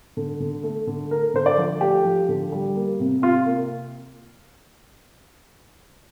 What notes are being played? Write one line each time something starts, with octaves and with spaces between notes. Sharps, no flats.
D3
D3
A3
D3
A3 A#4
D3 C5
D5
F3
A3 G4
F3
D3
G3
A#3
C3
C3 F4
A#3